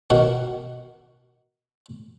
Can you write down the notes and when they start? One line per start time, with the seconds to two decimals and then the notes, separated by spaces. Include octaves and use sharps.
0.10 B2 D#3 A#4 F#5